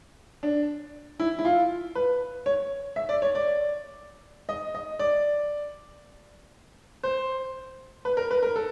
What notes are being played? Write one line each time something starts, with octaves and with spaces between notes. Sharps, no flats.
D4
E4
E4
F4
B4
C#5
E5
D5
C#5
D5
D#5
D#5
D5
C5
B4
A#4
B4
A#4
A4